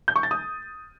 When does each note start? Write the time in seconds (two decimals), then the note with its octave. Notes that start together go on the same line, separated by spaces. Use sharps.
0.08 G6
0.16 C#6
0.23 A6
0.31 D#6